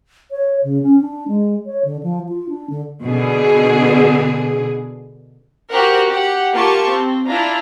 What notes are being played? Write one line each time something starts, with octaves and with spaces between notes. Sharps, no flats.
C#5
C#3
C#4
D4
G#3
C#5
D3
F3
F4
D4
D3
B2 D3 G#4
F#4 G4 A#4 C5 F#5
G4 F#5
A#3 F4 G4 A5 C#6
C4
D4 E4 F4 A#5